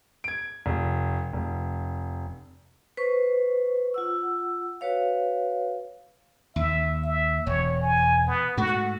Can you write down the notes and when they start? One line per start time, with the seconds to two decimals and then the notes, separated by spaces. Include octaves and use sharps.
0.24 G#6 D7
0.66 F1
1.33 F1
2.97 B4 C5 C#6
3.94 F4 F#5 E6
4.81 F#4 B4 C#5 F5
6.56 D#2 E5
7.04 E5
7.47 E1 C#5
7.82 G#5
8.27 B3
8.57 G#2 A3 F#4